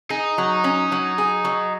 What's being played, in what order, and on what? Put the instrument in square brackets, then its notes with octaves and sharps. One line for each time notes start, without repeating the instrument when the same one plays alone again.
[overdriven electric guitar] D#4 [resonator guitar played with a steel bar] G#4
[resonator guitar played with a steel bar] F#3
C#4
F#3
G#4
F#3